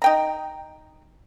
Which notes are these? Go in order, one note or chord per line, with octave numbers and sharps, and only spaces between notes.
D#4 G5 A#5